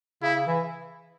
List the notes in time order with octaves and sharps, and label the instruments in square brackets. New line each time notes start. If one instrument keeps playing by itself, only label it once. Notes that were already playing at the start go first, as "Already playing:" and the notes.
[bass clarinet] C#3 [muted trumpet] E4
[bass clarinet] C#3
E3